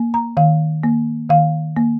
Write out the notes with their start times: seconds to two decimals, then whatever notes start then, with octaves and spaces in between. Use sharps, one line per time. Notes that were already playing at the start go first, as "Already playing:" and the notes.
Already playing: A#3
0.14 A#5
0.37 D#3 F5
0.83 A#3
1.30 D#3 F5
1.77 A#3